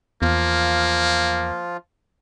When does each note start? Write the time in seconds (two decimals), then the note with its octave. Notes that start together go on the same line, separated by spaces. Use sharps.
0.22 E2 F3 A#3 F4